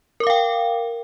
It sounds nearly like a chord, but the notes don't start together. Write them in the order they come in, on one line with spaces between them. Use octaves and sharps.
A#4 D6 F5 G5